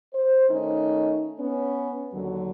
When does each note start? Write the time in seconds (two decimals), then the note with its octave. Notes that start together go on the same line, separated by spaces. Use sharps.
0.14 C5
0.49 D#3 A3 C#4 D#4
1.39 B3 C#4
2.12 D#2 D3 F#3